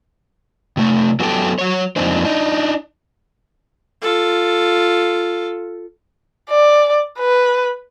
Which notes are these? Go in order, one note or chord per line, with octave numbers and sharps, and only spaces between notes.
C3 A3
F#3 B3 G4 A4 G5 A5
F#3 C#5
F2 A#3 C4 D4 D#4 C5
D4 D#4
F4 A4
D5
B4